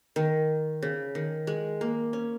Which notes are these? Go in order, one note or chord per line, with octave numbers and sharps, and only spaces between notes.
D#3
C#3
D#3
G#3
A#3
C#4